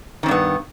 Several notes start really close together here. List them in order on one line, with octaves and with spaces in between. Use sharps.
D#3 C4 G2 B3